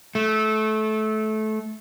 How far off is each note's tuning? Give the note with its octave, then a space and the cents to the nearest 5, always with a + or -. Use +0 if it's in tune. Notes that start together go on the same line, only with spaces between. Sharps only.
A3 -20